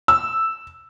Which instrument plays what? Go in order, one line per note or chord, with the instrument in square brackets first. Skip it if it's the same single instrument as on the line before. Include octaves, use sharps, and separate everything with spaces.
[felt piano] E6